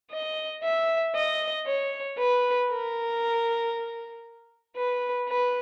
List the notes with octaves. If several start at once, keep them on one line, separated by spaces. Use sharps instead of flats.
D#5
E5
D#5
C#5
B4
A#4
B4
B4